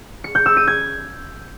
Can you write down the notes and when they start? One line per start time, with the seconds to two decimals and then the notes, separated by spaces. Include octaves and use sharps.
0.24 C#7
0.35 G6
0.46 E6
0.57 D#7
0.68 G#6